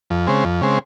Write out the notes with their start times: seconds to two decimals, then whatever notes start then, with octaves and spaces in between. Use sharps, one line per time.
0.10 F2
0.27 C#3 G#3 C4
0.44 F2
0.61 C#3 G#3 C4